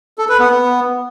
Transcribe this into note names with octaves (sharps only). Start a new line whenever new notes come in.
A4
B4
B3
B3